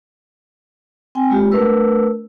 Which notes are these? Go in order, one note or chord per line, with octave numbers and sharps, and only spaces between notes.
C4 G5 G#5
G#3 A#3 F4 G4
A3 D4 A#4 B4 E6